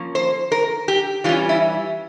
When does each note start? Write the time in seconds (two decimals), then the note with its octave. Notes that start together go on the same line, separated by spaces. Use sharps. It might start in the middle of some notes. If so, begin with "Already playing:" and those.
Already playing: F3 A#3 C#4
0.15 C5
0.52 A#4
0.88 G4
1.24 E3 G3 C#4 F4
1.49 E4